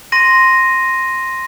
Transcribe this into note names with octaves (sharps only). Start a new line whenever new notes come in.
C6 A#6 D#7